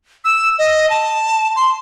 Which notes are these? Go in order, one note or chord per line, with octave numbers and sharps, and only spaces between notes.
E6
D#5
A5
C6